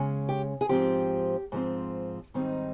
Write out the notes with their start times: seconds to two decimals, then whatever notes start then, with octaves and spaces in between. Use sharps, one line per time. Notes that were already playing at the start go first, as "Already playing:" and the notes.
Already playing: C#3 G#3 C#4
0.29 G4
0.61 G#4
0.69 G#2 F3 C4 G4
1.52 G#2 F3 C4
2.34 G#2 D#3 G3 C4 D#4